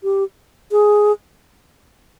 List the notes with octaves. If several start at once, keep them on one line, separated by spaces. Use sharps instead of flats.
G4
G#4